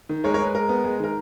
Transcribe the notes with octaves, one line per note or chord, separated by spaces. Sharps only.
D#3
G#3 A#4 C#5
A#4 C#5
G#3
B4
G#3 A#4
B3
G#3
D#3 A#4